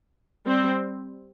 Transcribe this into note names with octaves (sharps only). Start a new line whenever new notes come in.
G3 C4